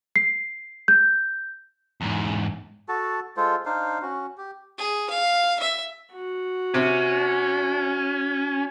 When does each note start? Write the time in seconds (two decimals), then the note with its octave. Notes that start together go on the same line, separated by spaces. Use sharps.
0.16 C7
0.88 G6
2.01 E2 G#2
2.89 F#4 A4 A5
3.37 G#3 F4 A4 C5
3.66 D4 D#4 C5 F5
4.02 C#4 F#4
4.38 G4
4.78 G#4
5.10 F5
5.60 E5
6.13 F#4
6.74 C3 C#4